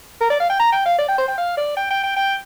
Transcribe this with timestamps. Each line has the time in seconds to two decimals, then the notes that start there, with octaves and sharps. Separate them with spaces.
0.21 A#4
0.30 D5
0.40 F5
0.50 G5
0.60 A#5
0.72 G5
0.86 F5
0.98 D5
1.09 G5
1.18 C5
1.28 G5
1.38 F5
1.57 D5
1.77 G5
1.90 G5
2.03 G5
2.16 G5